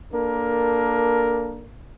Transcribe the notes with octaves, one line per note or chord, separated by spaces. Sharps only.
A#3 D4 A4 A#4